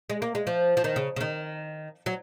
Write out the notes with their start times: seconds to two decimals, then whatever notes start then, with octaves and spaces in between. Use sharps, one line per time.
0.10 G#3
0.22 A#3
0.35 G#3
0.47 F3
0.77 F3
0.84 D#3
0.96 C#3
1.16 C#3
1.21 D#3
2.06 F#3